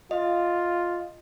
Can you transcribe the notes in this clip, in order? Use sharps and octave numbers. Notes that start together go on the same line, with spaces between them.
F4 D#5